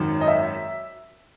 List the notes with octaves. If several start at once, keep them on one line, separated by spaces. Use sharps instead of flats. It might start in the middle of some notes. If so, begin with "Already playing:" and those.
Already playing: G#1 F#2 D#3
D#5
E5